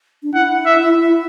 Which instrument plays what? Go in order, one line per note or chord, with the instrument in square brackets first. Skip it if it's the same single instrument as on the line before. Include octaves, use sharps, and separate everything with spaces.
[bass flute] D4
[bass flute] E4 [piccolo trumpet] F#5
[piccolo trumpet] E5